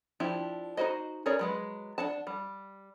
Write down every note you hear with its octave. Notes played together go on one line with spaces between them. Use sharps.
F3 D4 E4 G4
D#4 E4 F#4 C5 D#5
C#4 G#4 A#4 C#5 D5
F#3 G#3 B4
D4 F#5 A5
G3